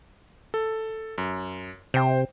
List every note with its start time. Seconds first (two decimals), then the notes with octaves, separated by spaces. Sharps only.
0.54 A4
1.18 F#2
1.94 C3 C5 G5